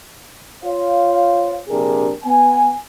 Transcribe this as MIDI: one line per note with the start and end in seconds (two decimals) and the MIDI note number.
0.64 1.59 65
0.64 1.59 72
0.64 1.59 73
0.64 1.59 77
1.69 2.11 34
1.69 2.11 48
1.69 2.11 62
1.69 2.11 67
1.69 2.11 68
1.69 2.11 70
2.24 2.73 59
2.24 2.73 80